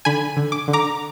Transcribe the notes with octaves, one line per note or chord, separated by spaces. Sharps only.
D3 G#5 B5
D3
D6
D3
A#5 D6